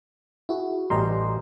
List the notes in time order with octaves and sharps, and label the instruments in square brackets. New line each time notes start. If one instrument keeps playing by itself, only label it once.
[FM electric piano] E4 F#4 G#4
[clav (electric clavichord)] A1 G3 [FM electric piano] D#5 A#5 C6